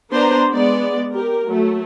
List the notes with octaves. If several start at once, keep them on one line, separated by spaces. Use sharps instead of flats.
B3 D4 B4 C5 A#5
G#3 B3 D5
G4 A#4
F#3 A3